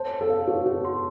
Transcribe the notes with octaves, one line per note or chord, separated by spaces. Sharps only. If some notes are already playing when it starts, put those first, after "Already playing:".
Already playing: C5 C#5 A5
C#5
A4
F5
F#4 C#5
F#4 C#5
C6